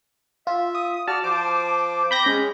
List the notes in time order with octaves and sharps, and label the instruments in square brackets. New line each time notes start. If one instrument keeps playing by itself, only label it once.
[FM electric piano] F4 [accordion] E5
[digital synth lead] D#6
[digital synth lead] F#4 [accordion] D5 F6 [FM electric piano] A5
[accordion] F3 C5 [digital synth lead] D6
[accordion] C4 [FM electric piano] B5 G6 A#6
[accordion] G#3 [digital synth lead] C#4